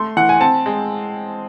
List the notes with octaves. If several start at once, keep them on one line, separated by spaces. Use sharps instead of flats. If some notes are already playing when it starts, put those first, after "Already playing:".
Already playing: A3 C6
E3 F#5
G#5
C4 A5
G#3